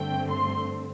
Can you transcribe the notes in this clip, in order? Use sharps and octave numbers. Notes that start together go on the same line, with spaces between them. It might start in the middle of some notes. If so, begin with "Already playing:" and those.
Already playing: G2 D3 A3 C4 G5
C6